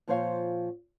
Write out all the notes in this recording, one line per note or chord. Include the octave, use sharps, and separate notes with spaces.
A#2 F3 C4 C5 C#5 F5